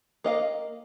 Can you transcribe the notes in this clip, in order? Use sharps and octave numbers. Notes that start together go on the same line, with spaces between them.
A#3 D#5 F5